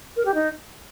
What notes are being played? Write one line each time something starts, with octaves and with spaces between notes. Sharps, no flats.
A#4
G4
D#4